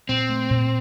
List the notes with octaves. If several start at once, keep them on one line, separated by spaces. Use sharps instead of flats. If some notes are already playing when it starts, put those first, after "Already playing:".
A#2 C4
A3
A#2